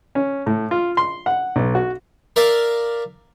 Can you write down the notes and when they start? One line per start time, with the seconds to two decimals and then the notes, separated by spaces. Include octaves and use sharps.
0.15 C#4
0.46 A2
0.71 F4
0.97 C6
1.26 F#5
1.56 B1
1.75 F#4
2.36 A#4 D5 E5 F5